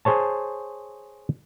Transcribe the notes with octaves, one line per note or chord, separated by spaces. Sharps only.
G#4 C5 C#5 A5